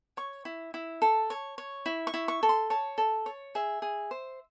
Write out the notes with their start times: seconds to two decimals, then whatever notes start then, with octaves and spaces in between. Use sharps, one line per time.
0.17 C#5 C#6
0.45 E4
0.74 E4
1.02 A4
1.30 C#5
1.58 C#5
1.86 E4
2.07 C#6
2.14 E4
2.28 C#6
2.43 A4
2.49 C6
2.70 C#5 A5
2.98 A4
3.26 C#5
3.55 G#4 E5
3.82 G#4
4.11 C5